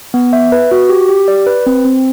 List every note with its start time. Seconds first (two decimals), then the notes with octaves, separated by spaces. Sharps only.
0.14 B3
0.33 E5
0.52 B4
0.71 F#4
0.89 G4
1.09 G4
1.28 D5
1.46 B4
1.66 C4
1.85 C4